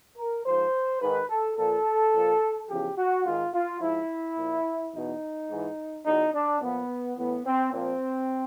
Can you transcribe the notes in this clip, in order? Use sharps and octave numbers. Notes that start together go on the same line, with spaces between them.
A#4
G#2 F3 C5
G#2 D#3 B4
A4
A#2 F3 A4
A#2 F3
E2 C#3 F3 G4
F#4
G#2 D#3 F4
F4
G#2 F3 E4
A#2 F3
E2 B2 D#4
G#2 E3
E2 B2 D#4
D4
A#2 F3 B3
A2 E3 B3
C4
A#2 F3 C4